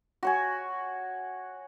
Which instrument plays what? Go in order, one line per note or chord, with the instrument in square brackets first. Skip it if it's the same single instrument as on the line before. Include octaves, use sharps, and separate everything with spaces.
[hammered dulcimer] F#4 C#5 G#5